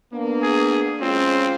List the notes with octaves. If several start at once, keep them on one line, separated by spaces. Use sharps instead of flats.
A#3 B3 D4
G#4
G#3 C4 C#4 F4